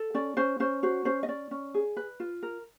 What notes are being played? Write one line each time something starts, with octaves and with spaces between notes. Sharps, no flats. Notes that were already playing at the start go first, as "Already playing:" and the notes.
Already playing: A4
C#4 D5
C#4 C5
C#4 C5
F#4 C5
C#4 C5
D#5
C#4 D5
C#4
G#4
B4
F4
A#4